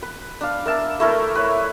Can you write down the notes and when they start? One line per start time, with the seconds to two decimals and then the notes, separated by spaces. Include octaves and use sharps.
0.02 B4
0.41 D4 F5
0.65 A#4 E5 A5
1.00 A3 E4 A#4
1.35 B4 C#5